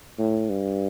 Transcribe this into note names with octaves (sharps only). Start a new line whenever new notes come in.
A2
G2